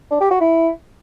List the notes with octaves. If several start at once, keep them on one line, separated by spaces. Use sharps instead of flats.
D4
G4
F#4
E4